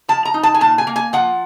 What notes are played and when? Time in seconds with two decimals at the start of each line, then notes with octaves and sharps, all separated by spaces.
0.08 F3 A5
0.25 A#5
0.34 D#4
0.43 A5
0.54 G#5
0.61 A#2 A5
0.78 G#5
0.87 A#3
0.96 G#5
1.13 F3 F#5